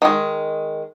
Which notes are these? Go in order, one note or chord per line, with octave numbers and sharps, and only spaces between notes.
D#3 G#3